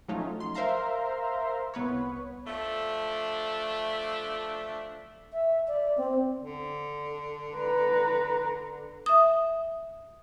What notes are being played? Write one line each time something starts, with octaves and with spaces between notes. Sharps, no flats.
F3 F#3 A3 C#4 D#4 F4
C6
A#4 C5 E5 F5 A#5 C6
C2 B3 B4 C#5
F3 A3 D4
E5
D5
C4
D3
B4 A#5
E5 D#6